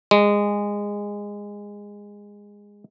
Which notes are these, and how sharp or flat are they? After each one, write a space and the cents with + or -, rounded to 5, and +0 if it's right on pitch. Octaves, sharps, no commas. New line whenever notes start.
G#3 -20